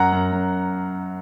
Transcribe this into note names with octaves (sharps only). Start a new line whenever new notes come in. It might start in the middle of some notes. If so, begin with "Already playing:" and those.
Already playing: F#2 F#5 A#5
F#2
F#2